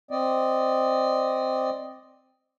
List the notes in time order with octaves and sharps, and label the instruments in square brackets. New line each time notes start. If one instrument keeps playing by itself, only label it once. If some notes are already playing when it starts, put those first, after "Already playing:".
[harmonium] C4 D5 D#5